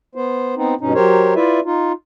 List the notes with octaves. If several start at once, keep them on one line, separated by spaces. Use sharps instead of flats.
B3 C5
B3 C4 D#4
G2 B2 C#4 D#4
F#3 G4 A#4 C5 C#5
E4 F4 B4 D5 E5
D#4 F4